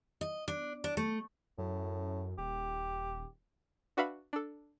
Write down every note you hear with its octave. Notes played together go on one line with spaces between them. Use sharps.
D#5
D4
D4
A3
F#2 A2
D#1 G4
D4 F#4 B4 E5 F5 B5
D4 A4